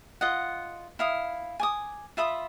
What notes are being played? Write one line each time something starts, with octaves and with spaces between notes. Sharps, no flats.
F4 D#5 F#5
E4 F5 D#6
G#5 D6 D#6
F4 E5 B5 D#6